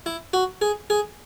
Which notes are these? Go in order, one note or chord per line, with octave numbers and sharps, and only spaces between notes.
E4
F#4
G#4
G#4